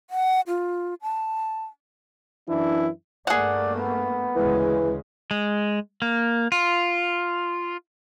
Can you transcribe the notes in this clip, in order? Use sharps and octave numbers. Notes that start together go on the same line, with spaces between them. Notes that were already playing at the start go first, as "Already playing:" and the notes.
F#5
F4
A5
F#2 E3 D4 E4
G2 A3 A#3 G#4 D5 F#5
B3
D2 C#3 E3 G#3
G#3
A#3
F4